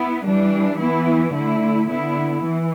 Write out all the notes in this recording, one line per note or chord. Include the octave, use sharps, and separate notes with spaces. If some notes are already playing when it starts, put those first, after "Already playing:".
Already playing: B3 E4
E3 G3 D4
E3 B3 E4
D3 A3 E4
D3 B3 E4
E3